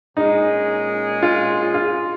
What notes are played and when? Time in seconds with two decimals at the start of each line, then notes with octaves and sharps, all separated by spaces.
0.17 A#2 G#3 C#4 D#4 G#4
1.23 F4
1.74 F4